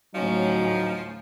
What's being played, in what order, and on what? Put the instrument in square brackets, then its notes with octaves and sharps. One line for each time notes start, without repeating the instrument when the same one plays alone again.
[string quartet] D2 A2 C#4 [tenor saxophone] F3 [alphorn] F#3 [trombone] D#4